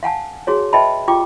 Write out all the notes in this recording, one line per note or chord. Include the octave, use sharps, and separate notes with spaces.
F5 F#5 G#5 A5
F#4 G#4 C#5
B4 D#5 E5 G5 A5 B5
F4 G4 G5 D6